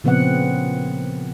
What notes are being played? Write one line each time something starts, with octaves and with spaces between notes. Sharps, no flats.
A#2 C#3 F3 B3 C4 F#5